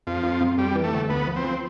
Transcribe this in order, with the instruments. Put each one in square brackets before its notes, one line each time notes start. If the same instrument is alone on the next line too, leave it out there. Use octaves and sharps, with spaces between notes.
[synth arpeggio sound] F2 [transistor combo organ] F3
[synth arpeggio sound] F2
F2
[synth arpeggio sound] F2 [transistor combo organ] G3
[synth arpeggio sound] E3
[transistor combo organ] A3
[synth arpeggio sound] G1
[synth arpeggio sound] D2 [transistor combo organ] B3
[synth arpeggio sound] F3
[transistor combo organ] C4
[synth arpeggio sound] F3